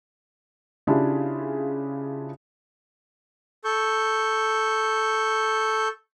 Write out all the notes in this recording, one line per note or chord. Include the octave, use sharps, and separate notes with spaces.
C#3 D4 E4 F4 G4 G#4
A4 C#6 G6